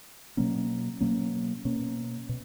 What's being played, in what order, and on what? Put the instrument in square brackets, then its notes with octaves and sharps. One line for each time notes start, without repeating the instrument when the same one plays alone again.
[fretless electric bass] B2 F#3 A#3 C#4
B2 F#3 A#3 C#4
B2 A#3 C#4
B2